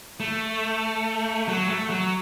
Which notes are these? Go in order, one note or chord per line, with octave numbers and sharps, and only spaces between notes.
A3
F#3
A3
F#3